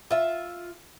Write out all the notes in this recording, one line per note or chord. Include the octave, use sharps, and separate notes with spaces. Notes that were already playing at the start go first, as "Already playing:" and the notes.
F4 E5